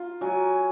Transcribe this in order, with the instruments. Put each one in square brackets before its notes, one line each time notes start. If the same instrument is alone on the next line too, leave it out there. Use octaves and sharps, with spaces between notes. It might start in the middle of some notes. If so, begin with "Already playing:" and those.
Already playing: [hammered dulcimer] F4 A#5
F#3 G#5